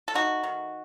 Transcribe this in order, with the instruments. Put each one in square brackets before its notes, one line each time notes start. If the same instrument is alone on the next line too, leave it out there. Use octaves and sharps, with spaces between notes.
[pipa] A4
A3 D#4 F#4
D#3